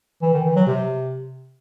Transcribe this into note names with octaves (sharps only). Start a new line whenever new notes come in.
E3
D#3
E3
F#3
C3